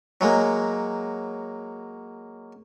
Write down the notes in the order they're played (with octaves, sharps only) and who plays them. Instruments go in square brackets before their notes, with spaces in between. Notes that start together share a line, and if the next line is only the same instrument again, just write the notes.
[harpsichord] F#3 G#3 A#3